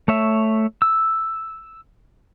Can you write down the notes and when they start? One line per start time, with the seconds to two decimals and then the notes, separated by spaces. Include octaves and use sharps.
0.08 A3 C#5 E5
0.82 E6